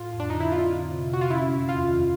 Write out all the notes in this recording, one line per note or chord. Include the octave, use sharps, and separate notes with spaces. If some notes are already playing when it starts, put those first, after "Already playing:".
Already playing: A2 F4
F2
D4
D3 D#4
E4
C4 F4
D3
C3
C3 F#4
F4
C#4 E4
F#2
E2 F4
D#3